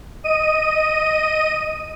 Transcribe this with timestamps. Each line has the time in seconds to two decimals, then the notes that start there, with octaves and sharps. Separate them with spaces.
0.24 D#5 D#7